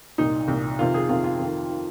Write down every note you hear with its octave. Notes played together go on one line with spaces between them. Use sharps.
C2 A#2 D#4
C2 A#2
F2 C3 D#3 F4
G#4
F2 C3 D#3 F4
F4
F2 D#3
D#3